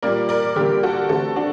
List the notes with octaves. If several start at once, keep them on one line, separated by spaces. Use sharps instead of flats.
A#2 G3 A#3 A#4 D5
A#4 D5
D3 G3 A#3 G4 A#4
F#4 A4
D3 A3 C4 F#4 A4
D4 F#4